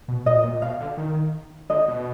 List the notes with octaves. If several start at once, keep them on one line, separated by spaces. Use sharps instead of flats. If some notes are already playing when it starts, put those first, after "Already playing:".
B2
A#2 D#5
A#2
B2 F5
D3
D#3
D3 D#5
B2